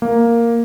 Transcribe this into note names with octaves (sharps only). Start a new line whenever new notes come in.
A#3